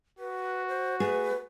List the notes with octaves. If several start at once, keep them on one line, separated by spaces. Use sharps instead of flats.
F#4 B4
C5
A3 G#4 B4